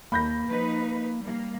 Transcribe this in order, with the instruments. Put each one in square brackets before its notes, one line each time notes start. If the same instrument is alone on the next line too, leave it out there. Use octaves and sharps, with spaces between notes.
[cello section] D#2 [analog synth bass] A#3 [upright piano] B5 G6 A#6
[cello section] F3 D#4 B4
G3 A#3